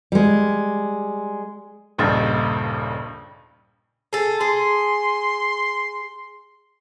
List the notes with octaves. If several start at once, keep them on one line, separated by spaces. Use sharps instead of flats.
G3 G#3
D#1 A#1 G2 C#3 D#4 A6
G#4 A4
G#4 C6